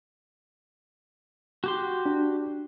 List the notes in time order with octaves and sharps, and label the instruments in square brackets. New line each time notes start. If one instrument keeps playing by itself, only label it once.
[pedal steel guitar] F#4 G4 C6
[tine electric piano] D4